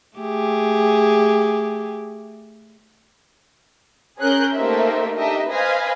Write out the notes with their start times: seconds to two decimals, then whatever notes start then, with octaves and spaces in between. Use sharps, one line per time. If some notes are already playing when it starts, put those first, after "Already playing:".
0.17 A3 G4 G#4
4.20 C#4 G#4 A#4 F#6 G6
4.55 A3 A#3 D#4 G4 C5 E5
5.16 D4 D#4 G4 D#5 E5
5.48 B4 C5 D#5 F5 G#5 B5